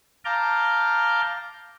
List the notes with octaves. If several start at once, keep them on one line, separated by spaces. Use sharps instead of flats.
F5 A5 A#5 D6 F6 G6